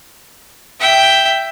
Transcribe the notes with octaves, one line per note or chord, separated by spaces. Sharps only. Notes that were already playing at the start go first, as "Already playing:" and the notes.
E5 G5